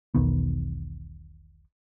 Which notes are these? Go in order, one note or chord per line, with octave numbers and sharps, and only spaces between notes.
E1 B1 D#3 B3